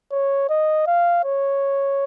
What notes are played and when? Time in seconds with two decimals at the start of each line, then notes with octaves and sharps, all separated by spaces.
0.11 C#5
0.49 D#5
0.87 F5
1.24 C#5